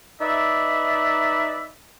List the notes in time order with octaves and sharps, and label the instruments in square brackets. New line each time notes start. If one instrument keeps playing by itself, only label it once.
[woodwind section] D#4 B4 D5 E5